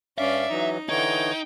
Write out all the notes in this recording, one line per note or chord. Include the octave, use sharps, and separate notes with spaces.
G2 C#4 D5 E5 F5
E3 F#3 D#4
D3 E3 D#4 C#5 G5